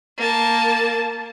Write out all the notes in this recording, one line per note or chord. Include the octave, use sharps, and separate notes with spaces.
A#3 A5